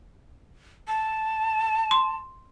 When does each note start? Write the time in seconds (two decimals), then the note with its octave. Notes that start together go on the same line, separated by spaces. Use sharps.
0.88 A5
1.91 C6